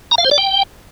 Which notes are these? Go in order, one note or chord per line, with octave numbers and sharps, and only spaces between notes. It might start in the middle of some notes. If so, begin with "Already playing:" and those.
A#5
F5
C5
D5
G5